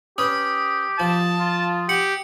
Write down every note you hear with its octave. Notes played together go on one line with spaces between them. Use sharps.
C#4 G4 B4 D#6
F3 A5
F4
G4 F#5 C#7